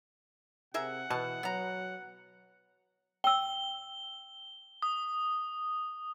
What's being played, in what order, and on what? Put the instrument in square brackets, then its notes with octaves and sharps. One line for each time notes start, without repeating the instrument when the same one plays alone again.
[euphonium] C3 [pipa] G#4 A#4 E5 [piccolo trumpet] F#5
[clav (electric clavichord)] B2 [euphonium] E3 [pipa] A5
[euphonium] F#3 [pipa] B3 A#5
[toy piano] G5 E6 [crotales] G7
[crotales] D#6